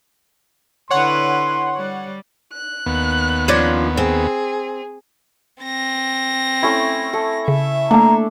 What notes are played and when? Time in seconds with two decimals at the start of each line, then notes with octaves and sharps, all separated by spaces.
0.91 D3 E4 B4 C#5 F#5 C6
1.77 G3
2.53 F#6
2.86 D#2 B3
3.48 F3 C#4 D4
3.97 C4 G#4
5.63 C4 A#6
6.63 A3 C#4 E4
7.13 A4
7.48 C#3 E5
7.91 A3 A#3 D4 A4 A#5